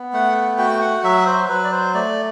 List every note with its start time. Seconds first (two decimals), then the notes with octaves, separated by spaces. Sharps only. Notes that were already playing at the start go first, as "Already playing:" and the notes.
Already playing: B3
0.13 A3 F#5
0.58 F#4 G5
0.81 F#5
1.04 F#3 E5
1.26 C5
1.49 F#3 B4
1.64 D5
1.72 C5
1.94 A3 D5